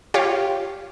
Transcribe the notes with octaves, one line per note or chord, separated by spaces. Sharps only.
F4 G4 C#5